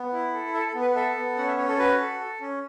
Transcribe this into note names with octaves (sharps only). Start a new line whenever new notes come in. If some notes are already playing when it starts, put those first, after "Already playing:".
Already playing: B3
E4
A4
A4 E5
A4
B3
B4
A4 E5
B3
C#4 F#5
E5
C#4 C#5
A4
F#4 B4
A4
A4
C#4